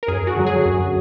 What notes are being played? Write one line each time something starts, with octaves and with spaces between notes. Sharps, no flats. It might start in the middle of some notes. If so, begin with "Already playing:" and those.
A#4
F#2 G#4
F#4
D3 F#3
G#4
F#2